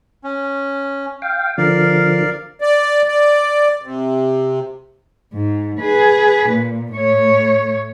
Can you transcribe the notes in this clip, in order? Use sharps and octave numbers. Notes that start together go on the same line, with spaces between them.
C#4
F5 G5
D3 F3 A#4 D5 F5
D5
D5
C3
G#2
G#4 B4
A#2
A2 C#5